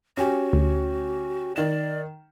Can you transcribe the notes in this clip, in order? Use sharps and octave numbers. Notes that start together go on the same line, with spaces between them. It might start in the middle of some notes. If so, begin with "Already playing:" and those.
C#4 F#4 G4 G#5
D2
D#3 D5 E7